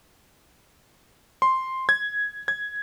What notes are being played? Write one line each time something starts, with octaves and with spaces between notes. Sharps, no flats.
C6
G#6
G#6